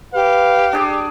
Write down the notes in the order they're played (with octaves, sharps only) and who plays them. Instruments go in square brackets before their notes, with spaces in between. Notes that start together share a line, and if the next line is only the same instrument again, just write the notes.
[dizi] G4 [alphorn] B4 [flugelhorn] F5
[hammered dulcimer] D4 G#4 D5